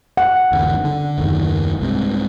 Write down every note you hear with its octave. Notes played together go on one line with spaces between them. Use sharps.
F#5
G1 D#2 C#3
D3
F#1 D#2 D#3
C2 G#2 C3